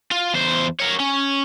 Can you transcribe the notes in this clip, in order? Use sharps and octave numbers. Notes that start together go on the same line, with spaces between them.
F4
E2 C5
A#4 C#5
C#4